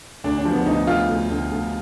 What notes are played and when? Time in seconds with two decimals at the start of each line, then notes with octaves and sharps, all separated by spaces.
0.24 D2 D4
0.38 D4
0.45 F3
0.52 B3
0.66 D2 D#4
0.87 D2 F4
1.09 D2
1.30 D2
1.51 D2